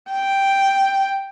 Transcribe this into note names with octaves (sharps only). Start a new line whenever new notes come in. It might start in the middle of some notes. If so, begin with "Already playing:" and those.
G5